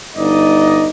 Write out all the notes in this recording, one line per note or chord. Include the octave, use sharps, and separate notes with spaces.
G1 D#4 D5 D#5